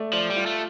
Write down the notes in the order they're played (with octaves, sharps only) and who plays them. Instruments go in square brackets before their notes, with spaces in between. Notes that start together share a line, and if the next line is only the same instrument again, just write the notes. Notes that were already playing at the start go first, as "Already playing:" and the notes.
Already playing: [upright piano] A3 D5
[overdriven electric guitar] F3 [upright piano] D5
[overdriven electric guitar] G3
[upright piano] F4
[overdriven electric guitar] A3